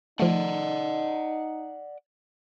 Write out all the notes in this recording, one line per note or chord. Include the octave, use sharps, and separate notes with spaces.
F3 A3 D#4 D5 F#5